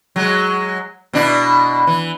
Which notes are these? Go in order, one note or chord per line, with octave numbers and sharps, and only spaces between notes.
F#3 G#3
B2 D4 E4
E3